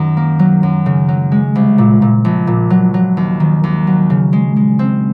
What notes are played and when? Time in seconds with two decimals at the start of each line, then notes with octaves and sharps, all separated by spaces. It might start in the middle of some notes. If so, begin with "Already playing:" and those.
Already playing: F#2 D#3 D#4
0.17 A#3
0.39 F#3
0.63 F#2
0.86 C#3
1.08 F#3
1.32 G#3
1.55 C2
1.78 A#2
2.02 A#2
2.25 A#1
2.47 A#2
2.70 F#3
2.94 F#3
3.17 D#2
3.40 D#3
3.64 D#2
3.87 F#3
4.10 C#3
4.33 G#3
4.56 G#3
4.79 C4